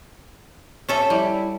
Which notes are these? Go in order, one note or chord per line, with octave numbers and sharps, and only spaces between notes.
C#4 A4 E5
G3 E4